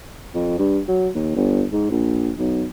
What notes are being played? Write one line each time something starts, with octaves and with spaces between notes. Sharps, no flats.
F2
G2
F#3
D#2
G1
G#2
A#1
B1